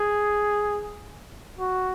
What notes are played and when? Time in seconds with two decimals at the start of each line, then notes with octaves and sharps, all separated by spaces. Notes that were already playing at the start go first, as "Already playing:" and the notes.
Already playing: G#4
1.60 F#4